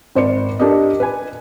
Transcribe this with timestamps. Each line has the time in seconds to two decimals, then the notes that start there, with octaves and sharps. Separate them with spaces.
0.15 G#1 C5 D5 C#7
0.59 D4 G4 A4 A#4 D5 D#5
1.00 B4 G#5